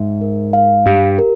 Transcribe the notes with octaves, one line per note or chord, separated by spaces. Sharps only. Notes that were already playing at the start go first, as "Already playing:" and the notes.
Already playing: G#2 E5
A#4
F5
G2 G4
A#4